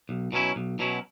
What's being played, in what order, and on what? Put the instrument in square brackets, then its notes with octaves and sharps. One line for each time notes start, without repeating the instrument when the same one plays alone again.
[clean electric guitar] B1
B2 F#3 C#4 E4
B1
B2 F#3 C#4 E4